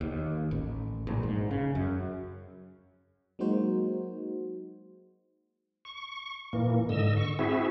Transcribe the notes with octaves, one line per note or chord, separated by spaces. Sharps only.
D#2
A1
A#1
G#2
C#3
F#2
F#3 G#3 A#3 D#4 F#4 C5
C#6
A#2 E3 A#3
G#2 D3 D#5 E6
C#6
C4 E4 F#4 G#4 E5